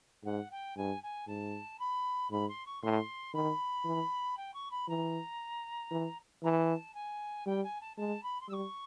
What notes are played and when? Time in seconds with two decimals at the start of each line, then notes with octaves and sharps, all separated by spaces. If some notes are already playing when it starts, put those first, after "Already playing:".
0.24 G#2 F#5
0.51 G5
0.76 G2 G#5
1.02 G#5
1.27 G#2 A5
1.79 B5
2.31 G#2 B5
2.48 C6
2.66 C#6
2.82 A2 C6
3.34 D#3 B5
3.85 E3
4.37 G5
4.53 C#6
4.71 B5
4.88 E3 A#5
5.91 E3
6.43 E3 A#5
6.48 A5
6.94 G#5
7.46 G3 G5
7.63 G#5
7.81 A5
7.97 G#3 A5
8.23 B5
8.40 C6
8.48 G3 E6
8.53 C#6